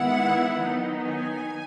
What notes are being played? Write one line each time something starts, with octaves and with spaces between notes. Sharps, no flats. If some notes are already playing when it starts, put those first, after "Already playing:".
Already playing: D#3 G#3 B3 E4 F#5
D#3 F#3 B3 D#4
G#5